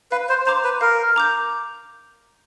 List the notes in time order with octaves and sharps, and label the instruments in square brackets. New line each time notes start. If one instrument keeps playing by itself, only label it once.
[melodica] B4 [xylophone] F5
[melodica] C5
[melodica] C5 [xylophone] A#5 D6 G6
[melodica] B4
[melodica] A#4 [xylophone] F5
[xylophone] A#5 D6 G6